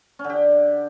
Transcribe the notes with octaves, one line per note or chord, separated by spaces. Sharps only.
C#4
D3
G4